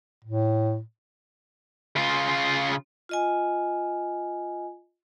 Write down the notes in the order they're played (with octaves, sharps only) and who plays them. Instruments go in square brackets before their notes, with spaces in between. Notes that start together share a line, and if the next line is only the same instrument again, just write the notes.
[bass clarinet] A2
[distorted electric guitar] C#3 F4
[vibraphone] F4 D#5 G#5